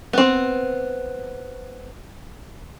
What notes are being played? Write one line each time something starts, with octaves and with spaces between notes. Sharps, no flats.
B3 C4